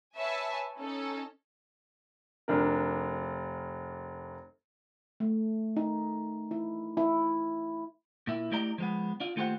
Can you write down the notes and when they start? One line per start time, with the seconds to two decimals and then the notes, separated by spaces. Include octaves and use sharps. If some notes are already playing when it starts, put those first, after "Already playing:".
0.17 B4 C#5 E5 G#5 A5
0.77 C#4 D#4 A4
2.48 F1 D4 A#4
5.20 A3
5.77 D#4
6.51 E4
6.97 E4
8.27 A#2 E4
8.52 A3 E4 G4 D5 D#5 A#5
8.78 F3 G#3 B3
9.20 D4 F4
9.36 D#2 A3 F4 G4 C5 F#5